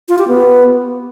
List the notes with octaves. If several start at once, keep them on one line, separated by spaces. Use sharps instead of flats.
F4
G4
B3